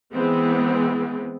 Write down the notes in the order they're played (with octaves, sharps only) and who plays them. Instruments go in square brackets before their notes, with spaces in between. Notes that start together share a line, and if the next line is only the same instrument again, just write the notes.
[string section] E3 G#3 B3 C4